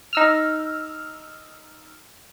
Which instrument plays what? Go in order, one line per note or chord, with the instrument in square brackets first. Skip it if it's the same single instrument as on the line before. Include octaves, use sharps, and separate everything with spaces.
[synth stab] D#4 E6 F6